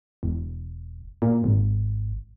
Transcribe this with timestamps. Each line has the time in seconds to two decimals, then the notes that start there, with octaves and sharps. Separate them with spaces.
0.23 E1
1.22 A#2
1.44 G#1